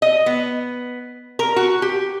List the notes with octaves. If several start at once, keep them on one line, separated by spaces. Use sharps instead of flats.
D#5
B3
A#4
F#4
G4